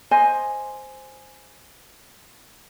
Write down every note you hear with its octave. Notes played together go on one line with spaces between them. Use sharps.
C5 D#5 G#5